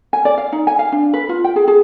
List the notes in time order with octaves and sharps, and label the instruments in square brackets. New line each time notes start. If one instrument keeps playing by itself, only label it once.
[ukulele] G#5
D5
F5
D#4
G#5
F5
D4
B4
F4
G5
G#4
G#4